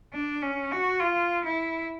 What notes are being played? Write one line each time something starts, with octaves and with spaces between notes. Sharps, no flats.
D4
C#4
F#4
F4
E4